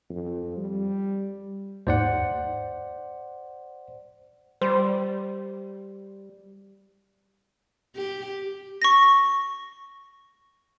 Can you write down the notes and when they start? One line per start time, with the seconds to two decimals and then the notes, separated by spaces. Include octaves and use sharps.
0.10 F2
0.57 G3
1.87 D#2 G#2 C5 D5 F#5
4.61 G3 C5
7.96 G4
8.82 C#6 A#6